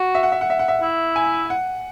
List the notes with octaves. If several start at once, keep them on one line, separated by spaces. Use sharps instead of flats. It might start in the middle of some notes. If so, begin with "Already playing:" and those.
Already playing: F#4
E5
F#5
E5
F#5
E5
F#5
E5
E4
G#5
F#5